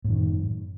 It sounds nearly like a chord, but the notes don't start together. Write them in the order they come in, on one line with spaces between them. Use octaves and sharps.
A2 F#2 D#3